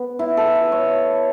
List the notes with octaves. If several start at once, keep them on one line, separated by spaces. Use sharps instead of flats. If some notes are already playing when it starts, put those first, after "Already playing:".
Already playing: B3
E4
A4
B4
C#5